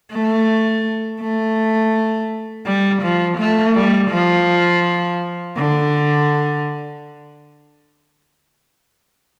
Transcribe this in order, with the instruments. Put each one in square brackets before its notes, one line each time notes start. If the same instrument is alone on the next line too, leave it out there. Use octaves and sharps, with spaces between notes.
[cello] A3
A3
G3
F3
A3
G3
F3
D3